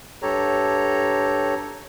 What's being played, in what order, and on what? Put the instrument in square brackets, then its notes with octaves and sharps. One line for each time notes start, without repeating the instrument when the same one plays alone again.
[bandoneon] G2 G4 A4 C#5 A#5